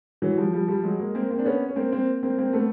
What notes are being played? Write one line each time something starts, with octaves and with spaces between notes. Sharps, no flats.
E3 F#3
F3 G3
F3 G3
F3 G3
F#3 G#3
G#3 A#3
A#3 C4
A#3 C4
D4
B3 C#4
C#4
A#3 C4
A#3 C4
A#3 C4
A#3 C4
A3 B3